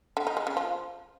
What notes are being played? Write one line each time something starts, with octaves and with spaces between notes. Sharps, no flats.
D3
D#4
G#3
C#3
F3